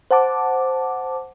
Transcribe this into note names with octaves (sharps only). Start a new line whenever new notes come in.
C5 F#5 A5 D6